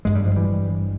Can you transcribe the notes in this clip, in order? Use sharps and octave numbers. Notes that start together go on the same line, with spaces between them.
G#1 G2 G#3
G3
F3
E3 G3